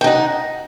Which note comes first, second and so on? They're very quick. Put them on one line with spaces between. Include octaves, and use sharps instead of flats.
G5 D#4 F#5